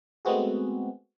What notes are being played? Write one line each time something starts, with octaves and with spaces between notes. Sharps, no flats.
G#3 A3 B3 C4 F#4 G#4